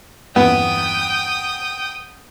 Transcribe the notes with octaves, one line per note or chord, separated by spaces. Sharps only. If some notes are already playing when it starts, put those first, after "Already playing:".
E2 G2 B3 G5 D#6